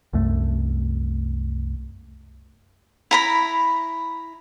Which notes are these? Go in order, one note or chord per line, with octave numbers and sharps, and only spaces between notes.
C2 F#2 A3
E4 A#5 B5